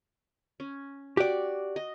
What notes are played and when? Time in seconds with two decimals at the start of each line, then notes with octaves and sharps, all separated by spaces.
0.60 C#4
1.17 F#4 G4 D5
1.76 D#5